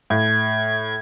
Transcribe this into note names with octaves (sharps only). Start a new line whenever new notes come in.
A2 G#6